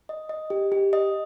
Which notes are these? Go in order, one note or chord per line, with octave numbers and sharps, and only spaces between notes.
D#5
D#5
G4
G4
D#5